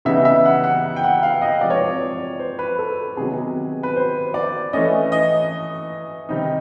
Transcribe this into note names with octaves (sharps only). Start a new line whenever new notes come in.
C#3 E3 G3 B3 D#4 E5
E5
F#5
F#5
G5
F#5
F5
D#5
C3 F3 G#3 D5
C#5
D5
C5
B4
A4
C3 D#3 F#3 B3 G#4
B4
C5
D5
E3 A3 C#4 D#5
D#5
C3 D#3 G3 C4 D#4